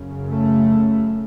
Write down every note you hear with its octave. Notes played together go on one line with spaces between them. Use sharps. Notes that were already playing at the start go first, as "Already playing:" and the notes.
Already playing: F#2 C#3
A3